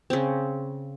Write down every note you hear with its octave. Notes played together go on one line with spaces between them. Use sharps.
C#3 C4